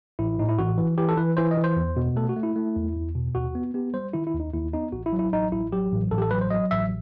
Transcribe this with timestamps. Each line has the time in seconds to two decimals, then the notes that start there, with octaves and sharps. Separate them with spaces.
0.19 A1 E4
0.39 A2 D#4
0.49 E4
0.58 A1 F#4
0.78 E3
0.98 E3 G4
1.09 A4
1.17 E3 B4
1.37 E3 C5
1.51 D#5
1.57 E3
1.64 C5
1.76 E2
1.96 B2
2.16 A3 A4
2.29 F#4
2.36 A3
2.43 E4
2.56 A3
2.76 E2
2.95 E2
3.15 B2
3.35 D#2 F#4
3.55 B3
3.74 B3 G4
3.94 G3 C5
4.13 D#3 E4
4.27 E4
4.34 D#2
4.40 D#4
4.53 D#2 E4
4.73 B3 D#4
4.92 A1 F#4
5.06 E4
5.13 F#3
5.19 E4
5.32 A1 D#4
5.52 A1 E4
5.72 F#3 G4
5.91 A1
6.11 A1 A4
6.18 G4
6.22 A4
6.31 F#3 B4
6.41 C5
6.50 F#3 D#5
6.71 A1 E5